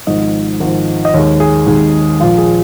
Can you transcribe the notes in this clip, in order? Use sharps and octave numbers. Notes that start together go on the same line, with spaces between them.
G#1 G#2 F3 D#5
G#1 G#2 F3
D#5
D#2 D#3 G#3 C#5
G#4
D#2 D#3 G#3
A#1 A#2 F3 F4
G#4